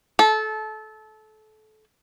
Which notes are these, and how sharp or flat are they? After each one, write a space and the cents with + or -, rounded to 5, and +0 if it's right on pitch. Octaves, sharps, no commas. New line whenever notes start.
A4 -25